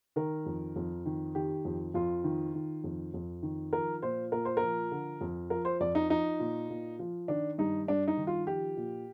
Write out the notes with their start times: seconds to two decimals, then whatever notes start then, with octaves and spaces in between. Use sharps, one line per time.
0.16 D#3 A#4
0.46 F2
0.76 F2
1.06 D#3
1.35 D#3 G4
1.65 F2
1.94 F2 F4
2.24 D#3
2.54 D#3
2.84 F2
3.14 F2
3.43 D#3
3.73 F3 A#4
4.02 A#2 C5
4.32 A#2 A#4
4.45 C5
4.57 F3 A#4
4.91 D3
5.21 F2
5.50 F3 A#4
5.65 C5
5.80 F2 D5
5.95 D#4
6.10 F3 D#4
6.40 A#2
6.70 A#2
6.99 F3
7.28 D#3 D4
7.58 G2 D#4
7.88 G2 D4
8.08 D#4
8.17 D#3
8.27 F4
8.47 F3 G4
8.77 A#2